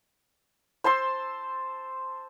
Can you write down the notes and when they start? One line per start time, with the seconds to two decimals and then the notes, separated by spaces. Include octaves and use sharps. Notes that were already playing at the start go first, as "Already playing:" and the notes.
0.84 C5 A5 C6 E6